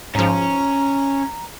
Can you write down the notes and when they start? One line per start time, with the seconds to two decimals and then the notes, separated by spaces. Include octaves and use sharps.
0.15 G#2 F3 C#4 A#5